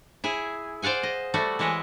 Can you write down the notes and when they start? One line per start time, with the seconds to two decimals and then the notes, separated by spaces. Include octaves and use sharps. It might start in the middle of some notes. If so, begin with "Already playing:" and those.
0.24 E4 G#4
0.82 C5 D5 F5 F#5 G#5
1.03 D#5
1.34 G3 A3 F#4
1.59 E3 G#3 E4 C#5 D#5